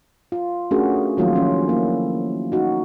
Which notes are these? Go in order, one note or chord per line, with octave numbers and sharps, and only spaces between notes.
F4
A3 C#4 D4 F#4 G#4 A#4
D#3 F3 F#3 A3 A#3 F4
D#3 F3 C#4 E4
A#3 E4
D#4 F#4